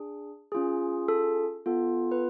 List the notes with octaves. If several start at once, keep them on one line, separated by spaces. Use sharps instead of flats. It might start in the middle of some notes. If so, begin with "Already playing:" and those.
Already playing: D4 G#4
C#4 F4 G#4
A4
B3 F4 A4
B4